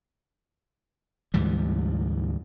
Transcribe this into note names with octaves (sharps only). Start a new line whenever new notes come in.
D2 G#2 E3 G3